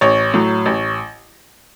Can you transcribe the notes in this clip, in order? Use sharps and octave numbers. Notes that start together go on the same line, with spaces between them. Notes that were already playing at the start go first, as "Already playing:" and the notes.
A1 C#5
A2 F#3
A1